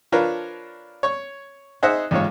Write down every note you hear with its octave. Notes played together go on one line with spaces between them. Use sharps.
F3 D4 F4 A#4 B4 C#5
C#5 C#6
D#4 G#4 C5 D#5 E5 F#5
A1 G#2 F4 C#5